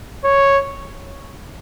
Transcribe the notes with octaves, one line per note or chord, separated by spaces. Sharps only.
C#5